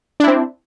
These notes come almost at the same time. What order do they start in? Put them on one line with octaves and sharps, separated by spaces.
D4 E4 C4